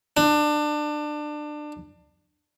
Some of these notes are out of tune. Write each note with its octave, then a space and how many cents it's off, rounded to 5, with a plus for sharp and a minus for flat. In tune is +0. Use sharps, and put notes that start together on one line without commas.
D4 +25